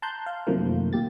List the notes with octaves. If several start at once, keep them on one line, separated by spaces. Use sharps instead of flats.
A5 A#5 C6 F#6 G6
F5
F#2 C3 D#3 F3 A3 A#3
A#2 G4 A6